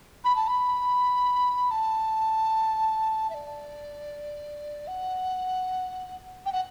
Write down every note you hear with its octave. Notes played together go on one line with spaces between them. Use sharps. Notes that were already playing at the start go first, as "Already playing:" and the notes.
B5
A5
B5
A5
E5
D5
F#5
G5
F#5